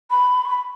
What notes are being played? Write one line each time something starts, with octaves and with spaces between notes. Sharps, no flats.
B5
C#6
B5